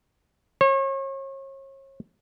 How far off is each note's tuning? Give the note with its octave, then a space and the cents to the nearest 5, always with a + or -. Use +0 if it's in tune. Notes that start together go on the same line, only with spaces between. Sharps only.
C#5 -35